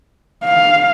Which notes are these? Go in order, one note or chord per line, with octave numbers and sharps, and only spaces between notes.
F5